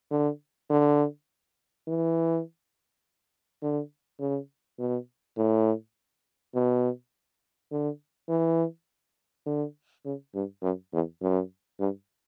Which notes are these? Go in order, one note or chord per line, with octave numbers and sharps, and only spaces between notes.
D3
D3
E3
D3
C#3
B2
A2
B2
D3
E3
D3
C#3
G2
F#2
E2
F#2
G2